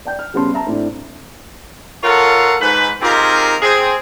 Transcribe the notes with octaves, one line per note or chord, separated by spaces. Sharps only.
D5 G5 G6
F6
C#3 G3 B3 C#4 A5 C6
E5 A5 A#5
A2 C4 D4 E4
F4 A4 A#4 C#5 F5 F#5
G#2 B4
C4 D#4 F4 G4 G#4 A#4
C4 G#4